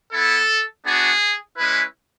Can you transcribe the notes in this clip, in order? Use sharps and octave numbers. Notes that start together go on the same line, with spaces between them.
B3 E4 A4
B3 D4 F#4 G#4
G#3 C#4 E4 B4